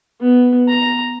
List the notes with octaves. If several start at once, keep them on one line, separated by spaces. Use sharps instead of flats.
B3
A#5